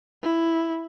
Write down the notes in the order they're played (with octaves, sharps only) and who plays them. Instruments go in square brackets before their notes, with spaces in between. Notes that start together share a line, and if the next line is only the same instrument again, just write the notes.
[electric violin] E4